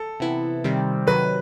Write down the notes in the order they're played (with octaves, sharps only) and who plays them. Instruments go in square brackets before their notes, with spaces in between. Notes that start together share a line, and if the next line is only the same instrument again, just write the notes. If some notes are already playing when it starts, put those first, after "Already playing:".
Already playing: [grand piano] A4
[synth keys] C3 E3 B3 E4
C3 D#3 G3 C4
[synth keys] C3 D#3 F#3 [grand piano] B4